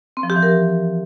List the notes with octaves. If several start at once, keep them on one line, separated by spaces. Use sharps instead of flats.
C4
F3
G4
E3
A#4